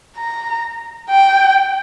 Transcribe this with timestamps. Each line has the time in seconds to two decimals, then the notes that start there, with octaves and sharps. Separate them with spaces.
0.17 A#5
1.10 G5